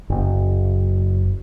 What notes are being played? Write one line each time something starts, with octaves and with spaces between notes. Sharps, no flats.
F#1